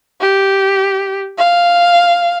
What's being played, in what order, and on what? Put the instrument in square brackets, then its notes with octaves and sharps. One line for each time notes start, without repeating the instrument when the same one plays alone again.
[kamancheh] G4
F5